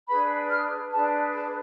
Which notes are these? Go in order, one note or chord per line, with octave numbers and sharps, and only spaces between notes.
D4 G#4 B4 B5
F6
D4 G#4 B4 A5
A5